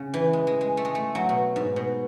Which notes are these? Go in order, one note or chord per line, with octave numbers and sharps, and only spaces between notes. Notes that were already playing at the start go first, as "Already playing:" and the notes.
Already playing: C#3
E3
G#3
G#3
G#3
A3
G#3
A3
F#3
B2
G#2
B2